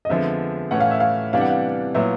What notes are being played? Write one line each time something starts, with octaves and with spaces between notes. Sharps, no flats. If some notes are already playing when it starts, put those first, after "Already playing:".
D#5
F2 D3 F3 G#3 B3 E5
A2 E3 A3 C#4 F#5
F5
E5
F5
C3 E3 G3 B3 D4 F5
F#5
F5
A#2 F#3 B3 E4 E5